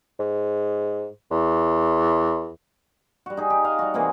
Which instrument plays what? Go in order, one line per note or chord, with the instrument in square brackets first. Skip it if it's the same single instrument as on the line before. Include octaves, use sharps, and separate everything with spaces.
[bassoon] G#2
E2
[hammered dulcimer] G3 F#4
D#4 G#4
G4
D#5 F5 G#5
G3 F#4
C3 E3 A#3 G#4